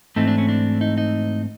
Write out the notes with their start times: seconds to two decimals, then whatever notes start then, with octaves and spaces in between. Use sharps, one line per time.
0.16 G#2 E3 A3 C4 D#4
0.28 D4
0.38 C#4
0.49 D4
0.81 D#4
0.98 D#4